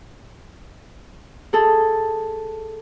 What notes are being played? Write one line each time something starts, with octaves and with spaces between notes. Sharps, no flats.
G#4 A4